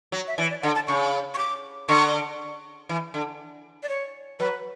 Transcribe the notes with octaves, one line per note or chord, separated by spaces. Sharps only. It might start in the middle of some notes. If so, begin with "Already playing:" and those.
F#3
E5
E3 D5
D5
D3 F#5
A5
C#3 C#6
C#6
D6
D3 C#6
E3
D3
D5
C#5
F#3 B4